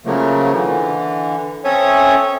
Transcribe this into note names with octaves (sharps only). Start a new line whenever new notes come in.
C#3 F3 F#3 A3 A#3
D3 E3
C4 C#4 A4 C#5 E5 D#6